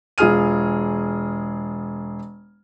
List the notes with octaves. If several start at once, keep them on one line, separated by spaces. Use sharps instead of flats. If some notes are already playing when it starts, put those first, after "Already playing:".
E1 F4 G#4 G#5 F6 D#7